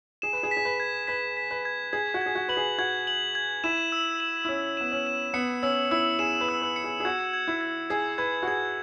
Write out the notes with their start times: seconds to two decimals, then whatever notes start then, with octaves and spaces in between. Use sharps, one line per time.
0.22 G#4 E7
0.33 B4
0.43 G#4
0.51 B6
0.57 G#4
0.65 B4
0.80 G#6
1.07 B4 B6
1.37 B6
1.51 B4
1.65 G#6
1.93 G#4 G#6
2.14 F#4
2.21 G#4 G#6
2.35 F#4
2.48 B4 F#7
2.57 G#4
2.78 F#4 G#6
3.07 F#7
3.35 G#6
3.64 E4 E7
3.92 E6
4.20 E7
4.45 E4
4.49 C#4 E6
4.77 B3 E7
4.92 C#4
5.06 E7
5.34 B3 C#7
5.63 C#4 E6
5.91 E4 E6
6.19 G#4 E7
6.41 B4
6.49 E6
6.62 B4
6.76 C#7
6.84 G#4
7.00 G#4
7.05 F#4 G#6
7.33 G#6
7.48 E4
7.61 G#6
7.90 G#4 G#6
8.18 B4 G#6
8.43 F#4
8.48 G#4 G#6